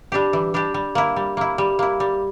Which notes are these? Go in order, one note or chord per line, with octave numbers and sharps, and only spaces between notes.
G3 D4 G4
E3
G3 D4 G4
G3
A#3 E4
G3
A#3 E4
G3
A#3 E4
G3